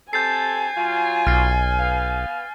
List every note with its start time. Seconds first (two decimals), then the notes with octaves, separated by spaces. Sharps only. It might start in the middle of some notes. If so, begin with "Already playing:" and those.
0.13 C3 C4 A4 G#5 G6 A6 C7
0.77 F#3 F4
1.27 B1 F6 A6 C7
1.79 B3 F5